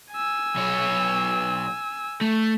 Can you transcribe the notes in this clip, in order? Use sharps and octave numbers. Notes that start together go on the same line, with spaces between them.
G#5 E6
B1 C#5
A3